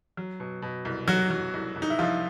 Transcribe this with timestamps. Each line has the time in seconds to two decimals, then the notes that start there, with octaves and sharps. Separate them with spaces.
0.17 F#3
0.40 B2
0.62 B2
0.85 C2
1.08 F#3 F#4
1.31 F#3
1.54 C2
1.76 C2
1.82 D#4
1.90 E4
1.99 C2 F3 F4